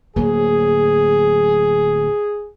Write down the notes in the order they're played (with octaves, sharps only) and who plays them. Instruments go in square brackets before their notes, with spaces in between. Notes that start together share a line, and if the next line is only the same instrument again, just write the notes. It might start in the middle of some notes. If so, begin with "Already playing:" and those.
[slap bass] D1 F#3 A#3 [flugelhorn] G#4